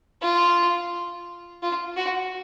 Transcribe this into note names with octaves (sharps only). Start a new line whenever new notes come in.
F4
F4
F#4